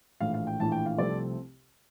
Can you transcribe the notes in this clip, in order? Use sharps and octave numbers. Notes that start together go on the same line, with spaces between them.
A#1 A2 E3 F5
F5
G5
A#1 A2 E3 A5
G5
F5
C2 C3 F3 A3 C4 D5